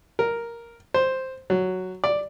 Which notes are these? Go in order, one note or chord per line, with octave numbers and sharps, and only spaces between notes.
A#4
C5
F#3
D5